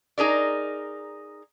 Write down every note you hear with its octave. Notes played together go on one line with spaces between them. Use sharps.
D#4 G#4 A#4 D5